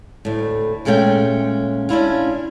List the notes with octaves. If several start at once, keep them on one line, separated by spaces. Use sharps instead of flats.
D2 A2
A#2 G#3 A3 C#4 F5 G5
C#4 D4 E4 F4